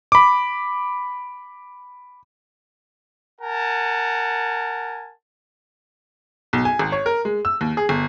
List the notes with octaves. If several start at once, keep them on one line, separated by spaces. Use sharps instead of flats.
B5 D6
A#4 F#5 G#5 A5
B1
G#5
G#1
C#5
A#4
G#3
E6
D#2
G#4
G1